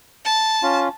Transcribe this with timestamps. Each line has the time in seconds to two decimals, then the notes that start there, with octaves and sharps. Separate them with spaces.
0.25 A5
0.63 C#4 F4